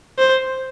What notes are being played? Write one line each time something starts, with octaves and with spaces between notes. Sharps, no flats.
C5